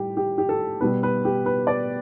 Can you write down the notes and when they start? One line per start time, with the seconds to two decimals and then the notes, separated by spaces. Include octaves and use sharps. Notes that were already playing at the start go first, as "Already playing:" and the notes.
Already playing: A2 G3 G4
0.17 G4
0.38 G4
0.49 A4
0.81 B2 G3 B4
1.03 B4
1.25 G4
1.46 B4
1.67 D5